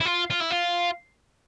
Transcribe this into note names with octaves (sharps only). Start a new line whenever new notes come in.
E4
F4
F4
E4
F4